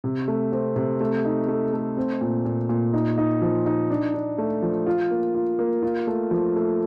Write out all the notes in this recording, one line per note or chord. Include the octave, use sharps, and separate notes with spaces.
C3
A3
C4
C3
A3
D#4
A3
A3
C4
A#2
A#2
A#2
D#4
D#4
F3
D#4
D4
D4
A3
F3
F4
A#3
F4
A#3
F4
A3
F3
A3